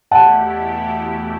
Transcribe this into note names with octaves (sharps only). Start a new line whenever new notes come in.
E2 B2 A3 E4 G4 F#5 A5